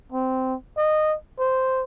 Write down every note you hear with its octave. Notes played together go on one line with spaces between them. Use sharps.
C4
D#5
C5